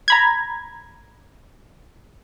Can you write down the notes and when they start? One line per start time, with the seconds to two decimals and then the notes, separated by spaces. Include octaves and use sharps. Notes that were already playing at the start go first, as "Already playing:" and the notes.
0.08 A#5 B5 G#6